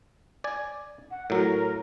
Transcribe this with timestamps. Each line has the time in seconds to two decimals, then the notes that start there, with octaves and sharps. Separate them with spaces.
0.44 D5 G#5
1.11 F#5
1.30 A2 F#3 A#4